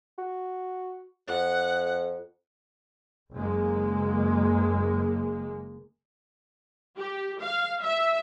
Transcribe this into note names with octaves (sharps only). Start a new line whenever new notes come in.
F#4
F2 F#5
F#1 G#3 A#3
G4
F5
E5